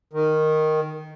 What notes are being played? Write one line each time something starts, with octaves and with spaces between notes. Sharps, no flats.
D#3